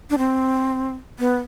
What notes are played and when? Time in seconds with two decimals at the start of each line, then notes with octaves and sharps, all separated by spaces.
0.10 D4
0.18 C4
1.19 B3